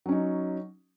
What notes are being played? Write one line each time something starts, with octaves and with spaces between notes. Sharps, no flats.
F#3 C#4 D#4